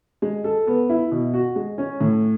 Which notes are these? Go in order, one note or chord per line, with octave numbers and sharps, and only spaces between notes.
G#3
A4
B3
E4
B2
F#4
G#3
C#4
A2